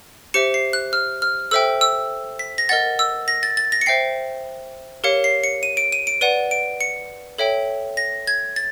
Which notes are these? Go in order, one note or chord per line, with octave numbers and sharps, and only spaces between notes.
G4 C5 E5 C#7
C7
F#6
F6
F6
A4 C5 E5 G5 E6
E6
B6
A#6
A#4 D#5 F#5 A6
E6
A#6
A6
A6
A#6
C#7
C5 E5 G5 C7
G4 A#4 C#5 F5 C#7
C7
C#7
D#7
D7
D#7
D7
B4 D5 F#5 D#7
D7
C#7
A4 C#5 E5 G5
A#6
G#6
A6